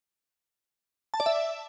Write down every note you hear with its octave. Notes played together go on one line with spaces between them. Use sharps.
A5
D5
E5